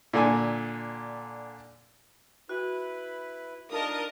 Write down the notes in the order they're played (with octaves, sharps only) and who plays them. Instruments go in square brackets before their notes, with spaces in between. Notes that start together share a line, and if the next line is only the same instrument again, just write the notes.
[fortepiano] A#2 D3 G#5
[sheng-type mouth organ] E4 B4 [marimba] F#4
[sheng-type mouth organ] D4 D#4 F4 [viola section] A#4 [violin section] D#5 A5 D#6